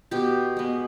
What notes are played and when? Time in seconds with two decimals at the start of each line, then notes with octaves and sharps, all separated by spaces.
0.11 B2 G4
0.57 G#3 B3